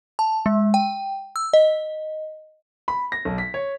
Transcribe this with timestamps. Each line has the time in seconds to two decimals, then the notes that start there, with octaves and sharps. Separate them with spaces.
0.19 A5
0.46 G#3
0.74 G5
1.36 E6
1.53 D#5
2.88 B5
3.12 A#6
3.25 B1
3.38 B6
3.54 C#5